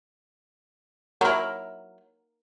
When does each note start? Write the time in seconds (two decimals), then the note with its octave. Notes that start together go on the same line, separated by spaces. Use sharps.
1.21 F#3 E4 A#4